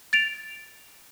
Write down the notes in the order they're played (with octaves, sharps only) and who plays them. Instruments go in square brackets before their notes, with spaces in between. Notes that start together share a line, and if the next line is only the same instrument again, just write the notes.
[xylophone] A6 D7 F7